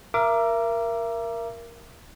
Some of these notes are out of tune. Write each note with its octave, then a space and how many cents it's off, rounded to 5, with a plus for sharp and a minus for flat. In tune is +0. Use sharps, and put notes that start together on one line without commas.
A#4 +5 E5 +40 D6 +0